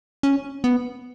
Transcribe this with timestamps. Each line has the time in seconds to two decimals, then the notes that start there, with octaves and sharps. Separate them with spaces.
0.23 C#4
0.64 B3